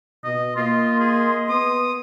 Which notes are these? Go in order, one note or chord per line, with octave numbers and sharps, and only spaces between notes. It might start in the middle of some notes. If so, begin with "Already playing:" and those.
B2 D#5
A#3 F4 D#5 C6
G#4
B3 D#6